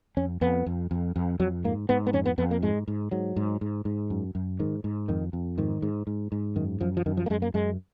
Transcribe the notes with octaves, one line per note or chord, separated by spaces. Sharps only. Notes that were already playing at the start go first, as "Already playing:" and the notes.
F2 C#4
F2 B3
F2
F2
F2
F2 F#3
G#2 A#3
G#2 B3
B3
F2 C#4
B3
F2 B3
A#3
G#2 G#3
G#2
G#2 F#3
G#2
G#2
G#2
F#2
F#2
G#2 D#3
G#2
F2 D#3
F2
G#2 D#3
G#2
G#2
G#2
F#2 D#3
F#2 F3
F3
F#2 D#3
F3
A#3
F#2 G#3
A#3
F#2 G#3